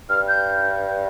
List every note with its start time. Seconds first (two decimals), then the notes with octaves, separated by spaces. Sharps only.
0.10 G2 F6
0.28 G6